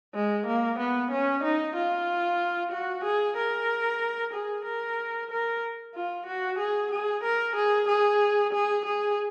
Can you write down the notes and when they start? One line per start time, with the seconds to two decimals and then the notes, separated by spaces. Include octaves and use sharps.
0.15 G#3
0.47 A#3
0.79 B3
1.12 C#4
1.44 D#4
1.76 F4
2.72 F#4
3.04 G#4
3.37 A#4
4.34 G#4
4.65 A#4
5.31 A#4
5.95 F4
6.27 F#4
6.59 G#4
6.92 G#4
7.24 A#4
7.56 G#4
7.89 G#4
8.53 G#4
8.85 G#4